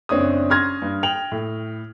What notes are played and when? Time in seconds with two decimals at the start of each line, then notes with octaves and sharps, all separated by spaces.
0.09 F#1 C4 D4 C#5 D#6
0.50 C#4 C6 F6 G#6 A#6
0.82 G2
1.03 G5 F7 F#7
1.32 A2